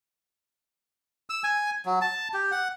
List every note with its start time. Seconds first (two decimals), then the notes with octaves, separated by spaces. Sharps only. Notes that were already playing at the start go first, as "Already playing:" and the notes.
1.30 E6
1.44 G#5
1.86 F#3
2.01 A5
2.34 G4
2.52 F#5